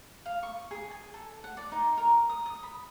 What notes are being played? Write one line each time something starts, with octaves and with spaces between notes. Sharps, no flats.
F5
C#6
G#4
G#5
A4
F#5
D5
D#4
A#4
D#6
D#6
B5